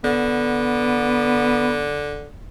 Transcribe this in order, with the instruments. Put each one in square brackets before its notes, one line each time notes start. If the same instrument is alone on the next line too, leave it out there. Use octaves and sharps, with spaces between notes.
[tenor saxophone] D3 [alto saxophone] B3